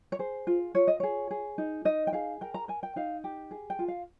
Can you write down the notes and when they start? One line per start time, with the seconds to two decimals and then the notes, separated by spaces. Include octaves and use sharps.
0.12 C#5
0.19 G#4 C5
0.47 F4
0.75 F4 C#5
0.88 D#5
1.00 G#4 C#5
1.31 G#4
1.58 D#4
1.85 D#4 D#5
2.07 G5
2.13 G#4 F5
2.41 A#4 G5
2.54 A#5
2.68 A#4 G#5
2.83 G5
2.96 D#4 F5
3.24 G4
3.51 G#4
3.70 G5
3.79 F4
3.88 F5